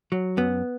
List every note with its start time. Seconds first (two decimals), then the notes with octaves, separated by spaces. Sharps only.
0.12 F#3
0.37 F#2 B3